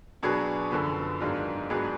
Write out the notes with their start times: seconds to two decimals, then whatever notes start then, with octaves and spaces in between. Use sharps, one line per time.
0.23 B2 F#3 B3 D4 G#4
0.71 F#2 D3 F3 B3
1.20 G#2 D#3 F#3 D4 F4
1.70 G#2 F#3 B3 D4 G#4